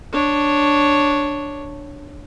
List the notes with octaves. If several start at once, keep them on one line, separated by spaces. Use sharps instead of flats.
D4 C#5